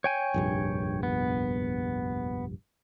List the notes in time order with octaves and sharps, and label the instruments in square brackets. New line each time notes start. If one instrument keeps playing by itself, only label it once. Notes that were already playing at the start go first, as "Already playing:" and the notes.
[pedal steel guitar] C#5 G5 G#5
[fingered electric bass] F1 A#1 G2
[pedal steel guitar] B3